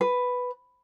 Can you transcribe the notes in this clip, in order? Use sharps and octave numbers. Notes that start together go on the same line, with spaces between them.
B4